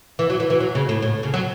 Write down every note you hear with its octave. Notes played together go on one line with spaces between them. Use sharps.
E3
F#3
E3
E3
F#3
C#3
A2
A2
C#3
F#3